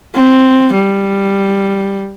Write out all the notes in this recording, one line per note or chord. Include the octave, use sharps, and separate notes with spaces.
C4
G3